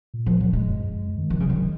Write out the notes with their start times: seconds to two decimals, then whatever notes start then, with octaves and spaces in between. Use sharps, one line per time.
0.14 A#2
0.26 F3
0.40 F#3
0.53 A#2 G#3
0.66 F#2
0.78 F#2
0.91 F#2
1.04 F#2
1.18 D#3
1.30 D#3 F3
1.40 C#3 F#3
1.50 D#3
1.56 F#3